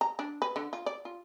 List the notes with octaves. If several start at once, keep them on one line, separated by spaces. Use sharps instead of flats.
A#5
D4
B4
D3
F4
D5
F4